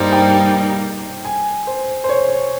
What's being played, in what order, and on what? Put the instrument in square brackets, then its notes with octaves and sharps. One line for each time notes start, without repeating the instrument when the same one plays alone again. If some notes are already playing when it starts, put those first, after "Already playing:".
Already playing: [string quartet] G2 G3 A#3 D#4 [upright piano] C5
[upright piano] G5
G#5
C5
C5
C#5